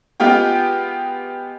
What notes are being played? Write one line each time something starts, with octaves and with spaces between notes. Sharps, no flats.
G#3 B3 F4 G4 G5